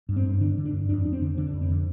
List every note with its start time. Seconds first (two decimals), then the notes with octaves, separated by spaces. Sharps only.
0.09 G2
0.16 C4
0.25 G2
0.41 D3 D4
0.58 D3
0.65 D4
0.73 G2
0.89 F2 D4
1.05 F2 D4
1.13 C4
1.22 D3
1.37 D3 D4
1.53 F2
1.61 C4
1.70 D3